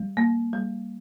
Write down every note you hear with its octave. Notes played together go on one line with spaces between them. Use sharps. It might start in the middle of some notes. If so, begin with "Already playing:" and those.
Already playing: G3
A#3
G3